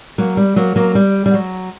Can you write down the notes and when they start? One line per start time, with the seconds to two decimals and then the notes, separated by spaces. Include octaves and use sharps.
0.18 F#3 A#3
0.37 G3
0.56 F#3 A#3
0.76 F#3 A#3
0.95 G3
1.26 G3
1.34 F#3